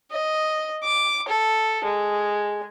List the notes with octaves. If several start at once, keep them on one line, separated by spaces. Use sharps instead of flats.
D#5
D6
A4
G#3